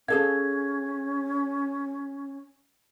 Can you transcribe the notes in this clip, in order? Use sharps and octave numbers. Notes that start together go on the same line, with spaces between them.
C#4 G#4 A4 F5 G#6